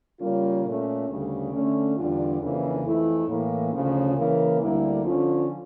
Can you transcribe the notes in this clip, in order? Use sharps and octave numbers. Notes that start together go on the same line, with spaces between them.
C#3 G3 A#3 C#4 F4
A#2 A3 C#4
D2 C#3 G3
D3 A3 C#4
E2 D3 G3 D4 F4
F2 C#3 E3 A#3 D4
F2 E3 A3 E4
A2 E3 A#3
D2 C#3 F3 C#4 F4
C#3 E3 A#3
D2 D3 G3 A#3 E4
D3 F3 C#4 F4